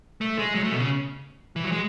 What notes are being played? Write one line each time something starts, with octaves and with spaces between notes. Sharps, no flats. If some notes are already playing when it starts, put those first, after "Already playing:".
A3
G#3
F#3
A3
B2
C#3
E3
F#3
G#3